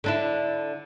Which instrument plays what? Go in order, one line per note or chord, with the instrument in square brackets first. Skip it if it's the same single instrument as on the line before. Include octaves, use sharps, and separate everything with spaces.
[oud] D3 D4 E4